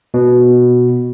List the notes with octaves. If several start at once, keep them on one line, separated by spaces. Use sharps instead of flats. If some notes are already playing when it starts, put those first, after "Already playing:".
B2